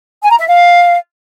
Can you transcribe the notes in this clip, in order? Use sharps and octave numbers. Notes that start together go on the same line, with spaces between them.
G#5
A#5
E5
F5